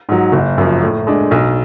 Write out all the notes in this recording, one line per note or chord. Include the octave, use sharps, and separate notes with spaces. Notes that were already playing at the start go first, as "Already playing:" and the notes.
G#2 F#3
F#1
F#2 F3
A2
G#3 D4
B1